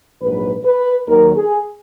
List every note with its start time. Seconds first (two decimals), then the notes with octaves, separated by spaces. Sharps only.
0.22 A#1 G#2 F#3 B4
0.65 B4
1.08 D#2 D#3 F#3 A#4
1.37 G#4